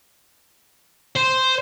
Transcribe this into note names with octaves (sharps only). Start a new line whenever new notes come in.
C5